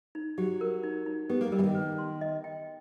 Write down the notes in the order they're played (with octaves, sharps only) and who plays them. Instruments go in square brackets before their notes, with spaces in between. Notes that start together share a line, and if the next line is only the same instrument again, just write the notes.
[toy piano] D#4
[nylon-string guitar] F#3 [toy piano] G4
[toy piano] A#4
D#4
D#4
[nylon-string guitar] B3 [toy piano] G4
[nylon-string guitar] A#3
[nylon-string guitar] G3 [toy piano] A#4
[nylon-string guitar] E3
D#3
[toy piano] B4
C6
D#5
G5